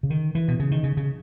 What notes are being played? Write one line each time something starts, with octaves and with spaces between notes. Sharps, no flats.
C#3
D#3
E3
B2
C#3
D#3
C#3
C#3